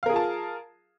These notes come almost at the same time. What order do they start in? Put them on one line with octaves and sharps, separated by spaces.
F5 A#4 G#4 F4 A5